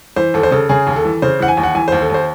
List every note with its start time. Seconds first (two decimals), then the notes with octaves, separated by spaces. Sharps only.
0.16 E3 C5
0.34 D#2 A4
0.43 C5
0.51 C#3 A4
0.69 C#3 G#4
0.87 D#2
0.96 A4
1.05 E3
1.22 C#3 C5
1.40 E3 F#5
1.48 G#5
1.57 D#2
1.63 F#5
1.75 E3 G#5
1.88 D#2 C5
2.01 A4
2.10 D#2 C5